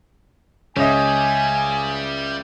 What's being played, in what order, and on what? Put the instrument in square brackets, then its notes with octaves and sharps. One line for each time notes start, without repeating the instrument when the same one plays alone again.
[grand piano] C#2 E5 [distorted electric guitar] G3 [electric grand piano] C#5 D#5 [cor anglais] G#5